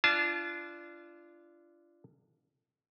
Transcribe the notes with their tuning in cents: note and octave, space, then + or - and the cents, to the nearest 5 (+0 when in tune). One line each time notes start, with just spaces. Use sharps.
D4 +0 F4 -30 A5 -30